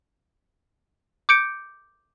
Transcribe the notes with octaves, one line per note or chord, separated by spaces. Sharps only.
D6 G6 C#7 D7